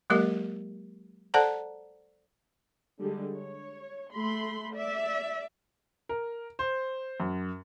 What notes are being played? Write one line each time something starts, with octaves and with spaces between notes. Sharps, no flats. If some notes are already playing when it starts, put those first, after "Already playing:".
F#3 G#3 A#3 G4 A#4 D#5
A4 C5 D5 F#5 A5 A#5
D3 G3 G#3
C#5
A3 B5 C6
D5 E5
A#4
C5
F#2